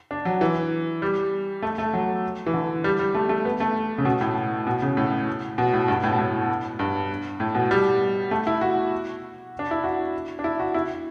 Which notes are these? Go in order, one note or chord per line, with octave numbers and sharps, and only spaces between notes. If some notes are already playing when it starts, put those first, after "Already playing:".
D4
F#3
E3
G3
A3
A3
F#3
E3
D3
G3
G3
A3
A3
B3
A3
C#3
B2
A2
B2
C#3
A2
B2
A2
G2
A2
B2
A2
G2
A2
B2
G3
A3
E4
F#4
D4
E4
F#4
D4
E4
F#4
E4